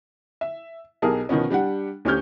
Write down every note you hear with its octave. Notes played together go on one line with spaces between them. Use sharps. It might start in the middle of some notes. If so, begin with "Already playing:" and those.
E5
B1 B2 G4 G#4 A#4 A5
B2 D#3 F3 B3 C#4
G3 D4 G4 F#5
D2 C#4 G4 F6 G6